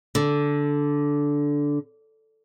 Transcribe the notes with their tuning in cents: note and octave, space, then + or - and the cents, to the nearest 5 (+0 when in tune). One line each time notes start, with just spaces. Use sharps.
D3 -10